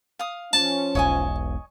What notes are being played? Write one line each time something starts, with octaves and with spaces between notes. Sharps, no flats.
F5 D#6
F3 C#4 A5
E1 B1 C#5 D#5 G#5